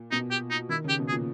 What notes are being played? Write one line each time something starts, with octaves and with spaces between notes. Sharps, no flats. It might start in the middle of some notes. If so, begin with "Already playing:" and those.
Already playing: A#2
B2 D#4
G4
D#4
D#3 E4
C#3 G4
B2
G#4
A#2